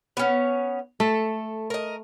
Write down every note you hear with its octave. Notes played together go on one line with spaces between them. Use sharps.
B3 C#4
A3 A4
A#4 D#5